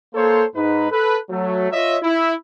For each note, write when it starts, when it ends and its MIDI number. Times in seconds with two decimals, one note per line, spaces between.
0.15 0.44 58
0.15 0.44 69
0.15 0.44 72
0.15 0.44 73
0.55 0.88 44
0.55 0.88 63
0.55 0.88 71
0.91 1.16 69
0.91 1.16 71
1.30 1.71 54
1.30 1.71 57
1.72 1.97 65
1.72 1.97 73
1.72 1.97 75
1.72 1.97 76
2.02 2.33 64